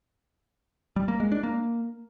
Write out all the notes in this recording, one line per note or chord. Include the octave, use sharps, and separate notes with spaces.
G3
A#3
G#3
D4
A#3